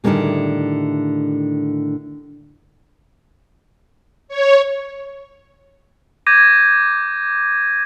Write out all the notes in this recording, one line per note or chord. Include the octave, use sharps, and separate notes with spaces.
A2 D3 D#3 G3 A#3 G#4
C#5
D6 G6 G#6 A#6 D#7